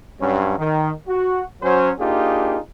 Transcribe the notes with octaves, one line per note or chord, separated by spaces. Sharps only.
G2 F#3 C#4
D#3
F#4
F#3 C#4 C5
A#3 D4 D#4 F4 G4 G#4